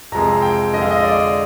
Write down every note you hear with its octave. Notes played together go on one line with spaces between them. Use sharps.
F2 C3 F3 G#3 A#5
G5
F2 D3 G#3 D#5
F5
D#5
D5